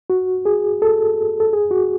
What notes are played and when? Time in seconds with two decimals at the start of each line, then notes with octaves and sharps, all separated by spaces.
0.10 F#4
0.46 G#4
0.82 A4
1.40 A4
1.53 G#4
1.71 F#4